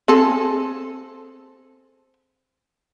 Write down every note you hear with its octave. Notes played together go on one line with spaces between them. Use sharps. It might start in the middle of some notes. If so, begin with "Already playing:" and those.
C4 G#4 A4